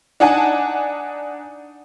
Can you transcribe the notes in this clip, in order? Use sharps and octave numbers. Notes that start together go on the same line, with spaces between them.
D4 D#4 F#5 G#5 A5